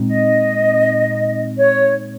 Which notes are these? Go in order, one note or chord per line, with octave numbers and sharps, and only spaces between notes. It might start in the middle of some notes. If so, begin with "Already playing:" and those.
Already playing: A#2 G#3 C4 D#4
D#5
C#5